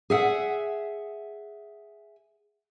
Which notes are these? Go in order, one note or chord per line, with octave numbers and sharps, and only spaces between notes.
G#4 E5 F#5